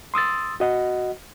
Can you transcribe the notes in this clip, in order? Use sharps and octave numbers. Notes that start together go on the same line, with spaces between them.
C6 D#6 E6 A6
F#4 D#5 F#5